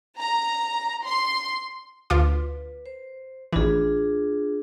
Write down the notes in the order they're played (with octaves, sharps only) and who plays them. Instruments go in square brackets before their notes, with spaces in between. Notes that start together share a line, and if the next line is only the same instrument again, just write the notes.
[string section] A#5
C6
[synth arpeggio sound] D2 F4 D6 [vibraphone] B4
[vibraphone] C5
[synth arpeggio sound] A1 E3 [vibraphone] D4 F4 G#4